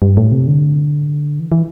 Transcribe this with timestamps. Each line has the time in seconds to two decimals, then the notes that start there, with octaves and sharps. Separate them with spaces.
0.02 G2
0.17 A2
0.32 C3
0.47 D3
1.40 E3
1.52 E3